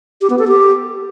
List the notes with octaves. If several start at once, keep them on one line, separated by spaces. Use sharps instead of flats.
G4
B3
A4
G4